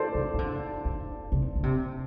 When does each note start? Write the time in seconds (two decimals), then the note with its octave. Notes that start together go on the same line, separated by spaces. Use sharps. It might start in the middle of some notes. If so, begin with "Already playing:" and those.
Already playing: A4 C5 D5
0.15 C3
0.34 E3
0.39 D3
0.85 D3
1.32 C3
1.56 D3
1.63 C3